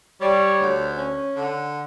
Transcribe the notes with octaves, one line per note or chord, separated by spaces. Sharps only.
G3 C#5
D2
C#4
D3